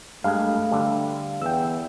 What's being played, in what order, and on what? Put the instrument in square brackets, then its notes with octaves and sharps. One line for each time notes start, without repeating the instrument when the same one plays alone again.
[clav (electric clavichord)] G2 G#3 [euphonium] A3 [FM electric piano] F5
[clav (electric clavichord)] G2 D3
[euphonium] E2 [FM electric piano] G5 E6